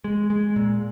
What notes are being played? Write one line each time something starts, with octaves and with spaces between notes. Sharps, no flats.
G#3
G#3
A#2